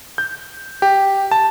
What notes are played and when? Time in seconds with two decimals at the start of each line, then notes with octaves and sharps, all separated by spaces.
0.18 G6
0.82 G4
1.31 A5